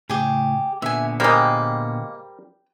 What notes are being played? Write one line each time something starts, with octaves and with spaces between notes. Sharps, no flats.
A2 C#3 G4 G#4
A#2 D3 B3 E5 G#5
G3 G#3 A#3 A#4 C5 G5